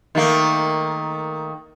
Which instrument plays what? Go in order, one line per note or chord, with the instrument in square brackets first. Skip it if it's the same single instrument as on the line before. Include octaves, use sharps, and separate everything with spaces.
[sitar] D#3 A3 A#3